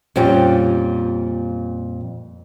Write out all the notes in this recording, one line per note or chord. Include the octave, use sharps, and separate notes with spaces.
F2 A#2 G3 C#4 G5